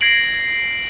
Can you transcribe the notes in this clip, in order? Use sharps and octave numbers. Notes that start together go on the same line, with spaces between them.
G#6 A#6 C7 D7 F#7